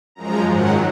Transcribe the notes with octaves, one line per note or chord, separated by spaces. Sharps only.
F#2 F3 G#3 A#5
G#2 D#3 F#3 F#5